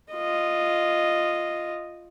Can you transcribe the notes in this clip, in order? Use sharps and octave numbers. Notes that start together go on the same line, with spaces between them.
F4 D#5